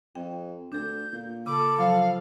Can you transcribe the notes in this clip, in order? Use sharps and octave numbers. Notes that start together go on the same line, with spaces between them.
F2 G5
D2 D4 A4 G6
A#2
C#3 A4 B5 D6
F3 F#3 F5